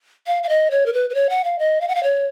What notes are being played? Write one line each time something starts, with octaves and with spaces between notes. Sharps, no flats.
F5
F5
D#5
C#5
A#4
B4
B4
C#5
F#5
F5
D#5
F5
F#5
F5
C#5